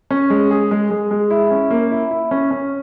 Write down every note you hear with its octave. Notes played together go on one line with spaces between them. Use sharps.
C#4
G#3
G#4
G#3
G#3
G#3
E4
C#4
A#3
E4
E4
C#4
C#4